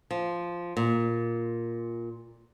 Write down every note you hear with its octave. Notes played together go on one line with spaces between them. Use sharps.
F3
A#2